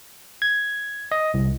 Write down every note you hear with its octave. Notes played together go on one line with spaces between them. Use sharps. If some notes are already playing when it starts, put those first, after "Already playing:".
G#6
D#5
C2